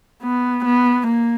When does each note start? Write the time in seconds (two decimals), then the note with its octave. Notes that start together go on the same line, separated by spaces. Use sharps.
0.23 B3
0.65 B3
1.07 A#3